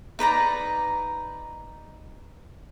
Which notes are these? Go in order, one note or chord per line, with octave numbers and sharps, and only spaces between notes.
D#4 B4 D5 A#5